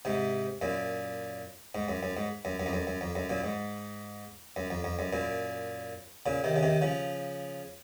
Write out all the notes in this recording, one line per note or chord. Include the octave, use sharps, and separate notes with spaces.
G#2 C3
F#2 A#2
G#2
F#2
F#2
G#2
F#2
F#2
F2
F#2
F#2
F2
F#2
F#2 A#2
G#2
F#2
F2
F2
F#2
F#2 A#2
A#2 C#3
C3 D#3
C#3
C3 D#3
C#3 F3